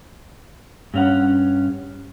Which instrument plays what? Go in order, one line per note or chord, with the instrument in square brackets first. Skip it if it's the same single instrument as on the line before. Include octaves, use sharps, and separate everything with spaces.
[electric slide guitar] G2 C#4 F#5